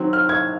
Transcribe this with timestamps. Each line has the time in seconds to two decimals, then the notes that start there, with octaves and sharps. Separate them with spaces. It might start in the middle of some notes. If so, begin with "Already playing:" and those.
Already playing: D#3 F#3 C4
0.13 F6
0.29 G#6